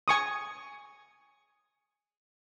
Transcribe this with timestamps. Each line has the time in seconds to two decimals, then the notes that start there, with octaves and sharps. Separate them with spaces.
0.08 G#5 C#6 D#6